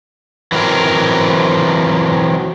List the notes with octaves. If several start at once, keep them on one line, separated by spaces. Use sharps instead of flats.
E3 F#3 C4 A#4